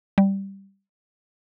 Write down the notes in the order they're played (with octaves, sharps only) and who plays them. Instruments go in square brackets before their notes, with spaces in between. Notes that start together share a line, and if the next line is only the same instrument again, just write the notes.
[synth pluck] G3